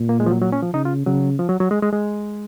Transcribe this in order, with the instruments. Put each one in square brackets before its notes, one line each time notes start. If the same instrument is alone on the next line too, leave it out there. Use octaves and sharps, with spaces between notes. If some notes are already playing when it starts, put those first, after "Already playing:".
Already playing: [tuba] A#2
[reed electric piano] A#3
G#3
F3
F#3
F#3
C#4
F3
[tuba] C#3 [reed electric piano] D#4
[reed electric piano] F4
[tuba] C#3 [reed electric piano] F#3
[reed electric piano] F3
F#3
F#3
G#3
G#3
G#3